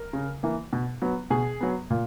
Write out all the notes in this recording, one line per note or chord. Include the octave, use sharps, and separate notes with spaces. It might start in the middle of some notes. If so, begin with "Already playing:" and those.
Already playing: A#4
C#3
E3 A#3
B2
F#3 B3
B2 G#4
F#3 B3
A#2